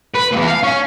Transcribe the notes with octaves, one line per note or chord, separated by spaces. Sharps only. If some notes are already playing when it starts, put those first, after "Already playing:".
B4
E2 A#2
F5
C#4